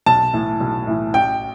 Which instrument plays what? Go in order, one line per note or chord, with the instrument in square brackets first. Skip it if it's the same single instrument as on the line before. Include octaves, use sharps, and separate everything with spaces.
[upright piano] B1 [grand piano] A5
[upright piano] A2 E3
B1
A2 E3
[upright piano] A1 [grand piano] G5